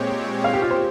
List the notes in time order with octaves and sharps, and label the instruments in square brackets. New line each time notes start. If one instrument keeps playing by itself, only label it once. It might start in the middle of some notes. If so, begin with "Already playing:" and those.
Already playing: [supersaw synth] A#2 G#3 C4 G4 C#5
[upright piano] F5
G4
F4
C5